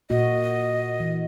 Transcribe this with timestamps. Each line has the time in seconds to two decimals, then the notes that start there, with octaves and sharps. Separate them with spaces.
0.10 A#2 A#3 F#4 D#5
1.00 E3